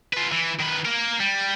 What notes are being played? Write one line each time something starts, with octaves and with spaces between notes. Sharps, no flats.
F4 B4
E3
D#3 B4
A#3 A#4
G3